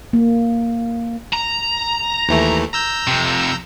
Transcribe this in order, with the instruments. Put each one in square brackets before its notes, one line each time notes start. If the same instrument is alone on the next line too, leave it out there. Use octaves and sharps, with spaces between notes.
[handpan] A#3
[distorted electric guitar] A#5
[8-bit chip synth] D#2 E3 A3
A#5 E6 G6
[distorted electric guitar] F2 C3